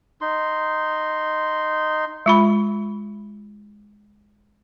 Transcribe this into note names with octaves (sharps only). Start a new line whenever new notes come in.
D#4 C6
G#3 F4 B5